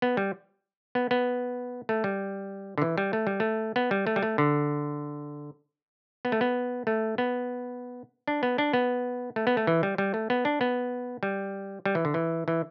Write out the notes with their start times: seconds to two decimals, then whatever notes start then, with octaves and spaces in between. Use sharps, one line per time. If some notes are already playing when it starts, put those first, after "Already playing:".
0.02 B3
0.17 G3
0.95 B3
1.11 B3
1.89 A3
2.04 G3
2.78 D3
2.82 E3
2.98 G3
3.13 A3
3.27 G3
3.40 A3
3.76 B3
3.91 G3
4.07 A3
4.16 G3
4.23 A3
4.38 D3
6.25 B3
6.32 A3
6.41 B3
6.87 A3
7.18 B3
8.28 D4
8.43 B3
8.58 D4
8.73 B3
9.36 A3
9.47 B3
9.57 A3
9.67 E3
9.83 G3
9.98 G3
10.14 A3
10.30 B3
10.45 D4
10.61 B3
11.23 G3
11.85 G3
11.95 E3
12.05 D3
12.14 E3
12.48 E3